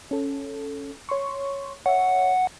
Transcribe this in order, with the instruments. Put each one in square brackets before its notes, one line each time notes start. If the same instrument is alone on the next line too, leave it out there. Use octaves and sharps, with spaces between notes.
[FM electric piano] C#4 A4
C#5 C6 C#6
[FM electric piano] C#5 E5 [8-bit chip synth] F#5